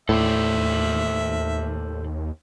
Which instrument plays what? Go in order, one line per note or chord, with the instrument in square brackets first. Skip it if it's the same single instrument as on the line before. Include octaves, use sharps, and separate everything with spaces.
[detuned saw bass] D#2 [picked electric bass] A2 [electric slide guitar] A4 C5 D5 [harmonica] E5